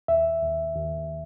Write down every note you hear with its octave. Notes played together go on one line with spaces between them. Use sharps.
D#2 E5
D#2
D#2